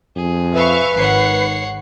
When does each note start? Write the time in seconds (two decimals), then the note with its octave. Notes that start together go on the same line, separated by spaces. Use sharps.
0.16 F2 G#4
0.54 B4 E5 F5 C#6
0.97 G#1 D#3 C#5 F#5 C7 C#7